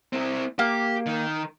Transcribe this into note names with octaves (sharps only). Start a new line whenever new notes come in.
C4 E4
A#3 G4
D#3